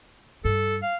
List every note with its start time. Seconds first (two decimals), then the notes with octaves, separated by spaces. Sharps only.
0.45 G2 A4
0.82 F5